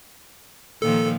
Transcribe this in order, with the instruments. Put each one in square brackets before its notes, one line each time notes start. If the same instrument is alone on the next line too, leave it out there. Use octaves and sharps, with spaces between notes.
[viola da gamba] A#2 D#3 F3 [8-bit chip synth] A4